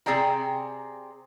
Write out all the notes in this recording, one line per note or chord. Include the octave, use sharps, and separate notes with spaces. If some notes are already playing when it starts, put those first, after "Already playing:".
C3 C4 G#4 D5 G5 A#5